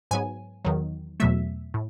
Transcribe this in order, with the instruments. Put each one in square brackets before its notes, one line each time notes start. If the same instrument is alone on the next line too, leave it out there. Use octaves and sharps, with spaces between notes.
[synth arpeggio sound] G#2 F#3 B3 G#5
E2 D#3 F#3
E2 B2 F#3 A3 E5
A2